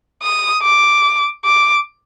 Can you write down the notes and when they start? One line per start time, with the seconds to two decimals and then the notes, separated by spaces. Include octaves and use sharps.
0.23 D#6
0.63 D6
1.45 D6